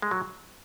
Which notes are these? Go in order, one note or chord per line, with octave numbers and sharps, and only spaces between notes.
G#3
F#3